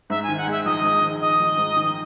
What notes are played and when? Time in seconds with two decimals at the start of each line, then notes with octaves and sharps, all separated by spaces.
0.10 G#2 E5
0.23 G#5
0.28 D#3
0.37 F#5
0.47 G#3 E5
0.65 A#1 D#5
0.83 G#2
1.02 D#3
1.21 G#3 D#5
1.40 A#1
1.58 G#2
1.77 D#3